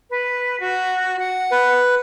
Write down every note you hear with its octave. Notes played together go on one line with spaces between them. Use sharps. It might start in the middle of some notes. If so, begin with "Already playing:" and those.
B4
F#4
F#5
B4